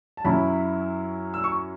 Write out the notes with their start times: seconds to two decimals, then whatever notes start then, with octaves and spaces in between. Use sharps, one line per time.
0.17 A5
0.25 F#2 F#3 C#4 E4 B5
1.34 E6
1.44 C#6